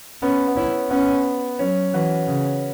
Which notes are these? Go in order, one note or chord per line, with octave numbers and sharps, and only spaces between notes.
B3 C#4
B3
C#4 E4
B3 C#4
F#3 C#4
E3 F#4 B4
C#3